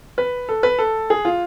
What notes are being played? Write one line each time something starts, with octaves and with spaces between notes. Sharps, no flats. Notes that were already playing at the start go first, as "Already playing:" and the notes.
B4
A4
B4
A4
G#4
F4